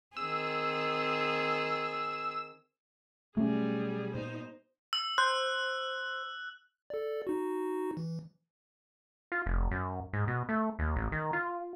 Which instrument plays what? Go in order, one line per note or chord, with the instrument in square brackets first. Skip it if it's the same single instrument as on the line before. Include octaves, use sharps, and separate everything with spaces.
[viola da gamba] D#3 C4 G#4 [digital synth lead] E6
[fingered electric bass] B2 F#3 [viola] G3 G#4 [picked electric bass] A3 C#4
[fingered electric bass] A#2 B3 [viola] D#4 C5
[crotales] E6
[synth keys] C5 [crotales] F#6
[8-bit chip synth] A4 D5
D#4 F#4
E3
[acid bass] F4
F1
F#2
G#2
B2
A3
D#2
A1
D#3
F4